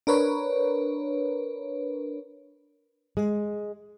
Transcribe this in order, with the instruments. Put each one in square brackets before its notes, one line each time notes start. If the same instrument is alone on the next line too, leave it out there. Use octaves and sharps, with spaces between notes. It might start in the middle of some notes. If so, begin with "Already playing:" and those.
[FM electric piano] D4 A#4 B4 C#5
[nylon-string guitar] G#3